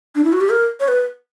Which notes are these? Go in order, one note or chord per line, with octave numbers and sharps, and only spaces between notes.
D4
E4
F#4
G4
A#4
C#5
B4